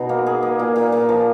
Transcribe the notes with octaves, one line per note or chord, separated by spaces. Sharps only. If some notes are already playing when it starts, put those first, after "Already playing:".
Already playing: B2 D#4
A#3
G#4
A#3
A#2
A#2
A#2
F3